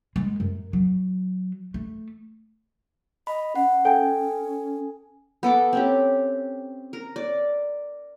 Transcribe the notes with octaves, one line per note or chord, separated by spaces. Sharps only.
G#3
F#2
F#3
A3
D#5 B5
C#4 F#5
A4 G5 G#5
B3 A4 B4 D6
C4 C#4 G4
A#4
D5